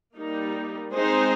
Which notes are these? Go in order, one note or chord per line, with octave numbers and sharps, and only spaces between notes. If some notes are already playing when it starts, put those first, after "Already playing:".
G3 A#3 D#4
G#3 C4 D#4 G#4 C5